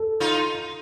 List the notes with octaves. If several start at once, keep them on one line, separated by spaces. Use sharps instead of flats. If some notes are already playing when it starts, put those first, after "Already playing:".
Already playing: A4
D#4 F4